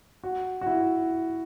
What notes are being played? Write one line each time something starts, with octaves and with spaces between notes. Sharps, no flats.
F#4
F#4
E4